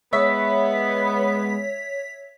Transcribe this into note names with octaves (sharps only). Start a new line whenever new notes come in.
G#3 B3 C#5 E5 B6